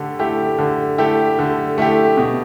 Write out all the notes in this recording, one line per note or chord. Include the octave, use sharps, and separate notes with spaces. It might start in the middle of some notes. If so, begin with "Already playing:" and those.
Already playing: D3 A3 G4
A3 E4 G4
D3
A3 E4 G4
D3
A3 E4 G4
B2